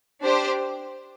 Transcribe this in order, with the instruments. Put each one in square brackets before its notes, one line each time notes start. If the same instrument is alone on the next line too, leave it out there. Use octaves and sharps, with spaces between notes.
[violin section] D4 G4 C5